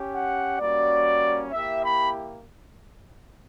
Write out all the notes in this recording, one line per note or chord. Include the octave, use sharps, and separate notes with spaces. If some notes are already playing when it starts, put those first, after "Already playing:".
Already playing: C#4 G4
F#5
G3 A#3 C#4 F#4 D5
A#3 E4 G4 E5
B5